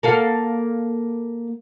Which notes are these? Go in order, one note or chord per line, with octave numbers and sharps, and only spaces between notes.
A#3 A4 F5